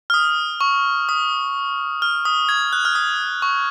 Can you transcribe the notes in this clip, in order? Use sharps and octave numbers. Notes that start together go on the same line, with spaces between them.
F6
D#6
C#6
D#6
F6
D#6
G#6
F#6
F6
D#6
C#6